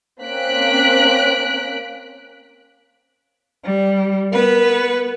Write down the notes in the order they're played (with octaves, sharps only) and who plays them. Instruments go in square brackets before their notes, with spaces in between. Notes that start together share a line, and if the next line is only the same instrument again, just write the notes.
[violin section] A#3 C4 C#4 F#6 B6 D7
[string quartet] G3
[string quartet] B3 B4 [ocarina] A#4